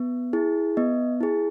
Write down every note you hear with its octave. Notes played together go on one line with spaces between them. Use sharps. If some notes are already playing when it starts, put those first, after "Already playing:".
Already playing: B3
E4 G#4
B3 D#5
E4 G#4